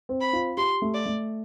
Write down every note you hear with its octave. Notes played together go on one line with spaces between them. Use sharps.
C4
B5
F4
G4 C6
A3
D5
A3